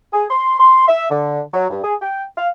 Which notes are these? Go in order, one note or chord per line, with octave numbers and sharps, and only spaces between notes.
G#4
C6
C6
E5
D3
F#3
G2
G#4
G5
F5